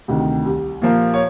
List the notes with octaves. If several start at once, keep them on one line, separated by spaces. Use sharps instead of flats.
D2 C3 D#3
C2
A#2 F3 A#3
C#5